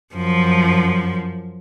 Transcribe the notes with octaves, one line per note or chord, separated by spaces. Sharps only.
F#2 F3